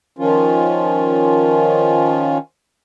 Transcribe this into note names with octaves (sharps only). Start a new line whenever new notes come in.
D#3 F3 C#4 F4